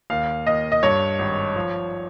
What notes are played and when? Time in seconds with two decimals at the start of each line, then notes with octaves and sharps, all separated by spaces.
0.10 D#2 F5
0.46 D#2 D#5
0.72 D#5
0.83 G2 C#5
1.19 G#1
1.56 F3